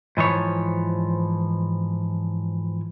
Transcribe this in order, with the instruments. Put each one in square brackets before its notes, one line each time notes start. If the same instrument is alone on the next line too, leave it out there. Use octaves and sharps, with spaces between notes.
[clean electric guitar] G#2 E3 F3 C#5